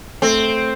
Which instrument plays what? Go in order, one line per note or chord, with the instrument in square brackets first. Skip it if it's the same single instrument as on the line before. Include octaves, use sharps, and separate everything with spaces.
[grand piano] A3 [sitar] C4